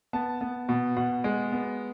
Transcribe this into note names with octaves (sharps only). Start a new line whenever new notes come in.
B3 A5
B3
B2
B2 F#5
G#3
B3